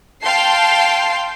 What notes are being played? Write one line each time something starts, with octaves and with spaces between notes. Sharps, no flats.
F5 G5 A5 C6 C7